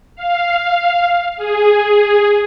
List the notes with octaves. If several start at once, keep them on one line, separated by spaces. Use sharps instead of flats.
F5
G#4